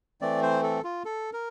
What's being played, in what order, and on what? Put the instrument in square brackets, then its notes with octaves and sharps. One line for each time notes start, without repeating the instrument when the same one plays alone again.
[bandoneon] E3 A3 C4 D5
C5
A4
F4
A4
A#4